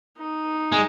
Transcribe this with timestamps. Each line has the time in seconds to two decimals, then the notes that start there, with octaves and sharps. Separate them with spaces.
0.18 D#4
0.72 G#3